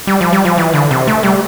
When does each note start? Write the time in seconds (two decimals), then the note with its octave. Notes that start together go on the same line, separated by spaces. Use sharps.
0.07 G3
0.21 F3
0.33 G3
0.45 F3
0.58 E3
0.74 D3
0.91 C3
1.08 A3
1.23 G3